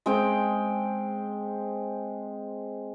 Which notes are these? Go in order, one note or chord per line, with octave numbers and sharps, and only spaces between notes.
G#3 C4 G5